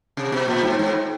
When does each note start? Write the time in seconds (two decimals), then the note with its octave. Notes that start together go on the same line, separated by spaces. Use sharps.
0.17 C3
0.32 B2
0.48 A#2
0.63 G#2
0.79 G#2